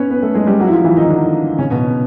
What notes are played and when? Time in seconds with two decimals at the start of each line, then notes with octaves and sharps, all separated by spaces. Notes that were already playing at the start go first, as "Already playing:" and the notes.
Already playing: B3 C#4 B4 C#5
0.10 B3 B4
0.22 A3 A4
0.34 G#3 G#4
0.47 G3 G4
0.60 F#3 F#4
0.67 E4
0.72 F3 F4
0.84 E3 E4
0.97 D#3 D#4
1.09 D3 D4
1.58 C#3 C#4
1.70 B2 B3